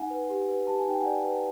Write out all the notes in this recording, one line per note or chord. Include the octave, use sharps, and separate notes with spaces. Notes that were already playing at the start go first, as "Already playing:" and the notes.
Already playing: D#4 F#5 G#5
B4
G4
B4
G4 A5
G#5
D#4 G5
D5 F#5 G#5
B4